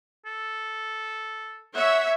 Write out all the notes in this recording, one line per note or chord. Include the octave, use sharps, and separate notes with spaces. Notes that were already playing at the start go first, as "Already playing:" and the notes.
A4
C#5 E5 F#5